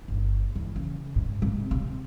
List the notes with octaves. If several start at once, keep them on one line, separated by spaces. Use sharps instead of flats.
G1
E2
C#3
G#2
C3
C3